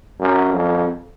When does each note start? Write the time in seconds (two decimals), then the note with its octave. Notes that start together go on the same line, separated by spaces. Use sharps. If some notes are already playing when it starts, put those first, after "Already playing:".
0.19 F#2
0.54 F2